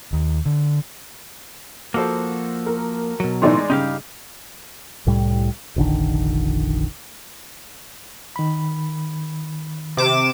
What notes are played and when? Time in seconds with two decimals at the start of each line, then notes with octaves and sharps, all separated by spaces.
0.13 D#2
0.46 D3
1.94 F3 A#3 F#4 A4 C5
2.66 A#4
3.20 B2 F#3
3.42 A2 E3 A3 D#4 D5 C6
3.57 G#3
3.70 G2 C#3 D#4 G4 F5
5.07 C2 A2 G3
5.76 F1 A#1 D3 D#3
8.36 D#3 B5
9.97 C3 D6 E7